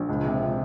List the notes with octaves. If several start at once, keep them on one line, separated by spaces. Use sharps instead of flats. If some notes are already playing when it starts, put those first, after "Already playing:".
Already playing: A#1
C#2
C3